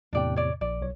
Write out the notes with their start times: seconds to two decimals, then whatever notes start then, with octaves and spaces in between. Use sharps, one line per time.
0.13 E2 A2 C3 D4 D5 G5
0.36 C#5 D5
0.61 A#1 D5
0.82 B1 C#5